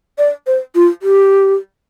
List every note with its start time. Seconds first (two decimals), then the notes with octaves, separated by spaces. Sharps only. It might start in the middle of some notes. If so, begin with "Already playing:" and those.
0.18 D5
0.47 C5
0.75 F4
1.02 G4